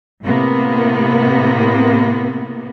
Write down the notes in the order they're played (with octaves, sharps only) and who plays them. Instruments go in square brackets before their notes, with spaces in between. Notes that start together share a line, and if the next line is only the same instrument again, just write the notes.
[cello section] A2 C3 A#3 B3